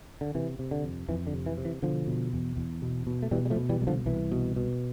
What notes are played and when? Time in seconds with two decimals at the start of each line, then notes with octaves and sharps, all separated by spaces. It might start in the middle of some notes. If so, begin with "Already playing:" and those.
0.21 D3
0.35 C3 E3
0.59 C3
0.71 D3
0.83 F2
1.09 F2 E3
1.27 D3
1.33 C3
1.46 E3
1.58 C3
1.65 E3
1.82 B2 D3 F3
2.07 B2
2.33 E2
2.57 E2
2.82 B2
3.07 B2
3.23 A3
3.31 B2 E3 G3
3.45 G3
3.50 F3 A3
3.56 B2
3.69 E3 G3
3.81 C2 G3
3.87 D3 F3
4.06 C2 E3
4.32 B2
4.56 B2